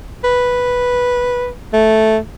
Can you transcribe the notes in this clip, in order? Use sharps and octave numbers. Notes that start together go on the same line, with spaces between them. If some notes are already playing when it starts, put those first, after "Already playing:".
B4
A3